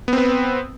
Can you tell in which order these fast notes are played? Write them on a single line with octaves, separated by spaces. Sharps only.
B3 C4 B4